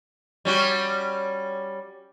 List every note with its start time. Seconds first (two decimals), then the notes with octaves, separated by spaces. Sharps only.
0.45 G3 C#4 F#4